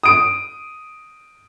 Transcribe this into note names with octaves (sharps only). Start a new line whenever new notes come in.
D#6 D7